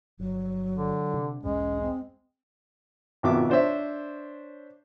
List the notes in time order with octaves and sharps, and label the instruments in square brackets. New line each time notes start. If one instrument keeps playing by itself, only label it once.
[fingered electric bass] G1 [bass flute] F#3
[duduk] D3
[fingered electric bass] C3 D4
[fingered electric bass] B1 E2 G#2 [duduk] G#3 [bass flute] C#4
[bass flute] C4
[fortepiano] G#1 F2 B2 E5 D6
D4 C5 C#5 E5